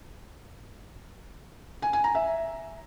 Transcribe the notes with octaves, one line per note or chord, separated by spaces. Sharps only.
G#5
G#5
A#5
E5